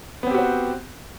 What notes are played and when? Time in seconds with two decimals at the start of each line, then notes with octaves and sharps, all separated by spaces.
0.23 B3
0.27 C4
0.31 G4
0.34 F#4
0.38 C5